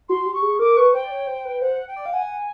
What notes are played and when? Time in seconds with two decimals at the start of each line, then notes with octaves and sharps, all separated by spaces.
0.09 F#4 C6
0.26 G4
0.34 C#6
0.42 G#4
0.59 A#4 D6
0.77 B4 C#6
0.94 C5 G5
1.04 D5
1.11 C#5
1.27 C5
1.45 B4
1.62 C5 F#5
1.88 G5
1.96 D5
2.06 F5
2.13 F#5 G#5